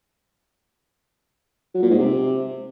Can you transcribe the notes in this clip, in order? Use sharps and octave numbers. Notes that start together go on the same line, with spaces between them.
F#3
A#2
G#2
C3